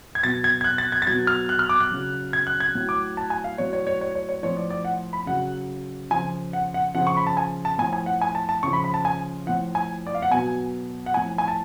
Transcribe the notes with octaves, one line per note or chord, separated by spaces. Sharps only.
G#6
B2 F#3 A6
G#6
G#6
F#6
A6
G#6
A6
B2 F#3 G#6
F6
F#6
F6
D6
F#6
C#3 F#3
G#6
F#6
G#6
A2 F#3
D6
A5
G#5
F5
A2 F#3 C#5
C#5
C#5
C#5
C#5
C#5
A2 F3 C#5
D5
D5
F#5
B5
C#3 F#3 F#5
C#3 F3 G#5
F#5
F#5
C#3 F3 F#5
C#6
B5
A5
G#5
A5
A2 F3 G#5
G#5
F#5
G#5
A5
A5
C#3 F3 C#6
B5
B5
A5
G#5
A2 F3 F#5
G#5
D5
F5
F#5
B2 F#3 G#5
F#5
A2 F3 G#5
G#5
A5